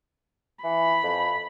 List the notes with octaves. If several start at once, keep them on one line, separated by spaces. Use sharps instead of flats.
E3 B5
F2